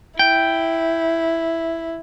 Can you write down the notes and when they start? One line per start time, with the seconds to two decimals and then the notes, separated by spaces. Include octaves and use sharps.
0.19 E4 G5